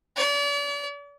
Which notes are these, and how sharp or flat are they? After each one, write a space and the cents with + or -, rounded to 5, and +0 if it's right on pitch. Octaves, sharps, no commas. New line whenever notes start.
D5 -40